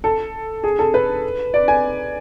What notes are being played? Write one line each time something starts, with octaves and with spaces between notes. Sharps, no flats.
A4
G#4
A4
B4
D5
G#5